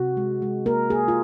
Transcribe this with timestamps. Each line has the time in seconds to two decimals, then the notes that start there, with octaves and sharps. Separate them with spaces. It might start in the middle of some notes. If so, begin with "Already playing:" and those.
Already playing: C3 F#4
0.17 G#3
0.42 G#3
0.66 A#3 A#4
0.90 A#3 G#4
1.08 F4